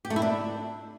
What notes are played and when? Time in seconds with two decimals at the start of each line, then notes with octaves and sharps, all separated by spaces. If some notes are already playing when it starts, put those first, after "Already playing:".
0.05 G4
0.10 A3
0.16 E4
0.22 D4